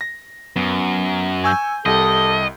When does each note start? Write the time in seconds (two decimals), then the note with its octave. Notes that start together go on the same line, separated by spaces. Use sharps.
0.01 A#6
0.56 F#2 B3
1.44 G#5 C#6 E6 G6
1.86 C2 G4 A4 D#5